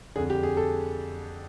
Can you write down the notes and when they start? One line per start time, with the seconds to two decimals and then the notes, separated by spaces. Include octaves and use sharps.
0.16 D3 G#4
0.18 F2
0.30 G4
0.43 G#4
0.57 A4